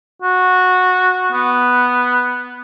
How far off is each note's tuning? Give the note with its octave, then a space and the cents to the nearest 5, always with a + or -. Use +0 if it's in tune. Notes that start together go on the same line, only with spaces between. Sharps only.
F#4 -15
B3 +0